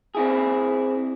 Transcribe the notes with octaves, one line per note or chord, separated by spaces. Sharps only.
C4 E4 G#4